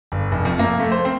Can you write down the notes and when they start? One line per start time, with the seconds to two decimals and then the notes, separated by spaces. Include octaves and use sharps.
0.12 G1
0.31 F1
0.45 F2
0.59 A#3
0.80 A3
0.92 C5
1.05 C4